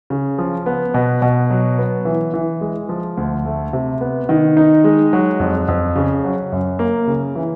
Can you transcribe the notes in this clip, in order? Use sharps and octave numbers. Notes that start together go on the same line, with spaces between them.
C#3
F3
B3
B2
B2
F#3
B3
E3
E3
G#3
F3
D2
A3
C3
B3
D#3
D#4
G#3
F#3
F2
F2
C#3
F#3
F#2
A#3
C#3
E3